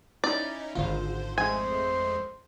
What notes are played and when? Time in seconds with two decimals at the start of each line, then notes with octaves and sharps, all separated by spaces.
0.24 C#4 D#4 E4 D5
0.75 G#1 D3 F4 C5
1.38 F2 G#3 A3 C5 G#5